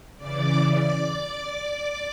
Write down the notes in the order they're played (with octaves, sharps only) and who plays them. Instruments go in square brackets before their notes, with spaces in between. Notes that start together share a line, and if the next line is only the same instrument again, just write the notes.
[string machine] C#3 E3 D5 D6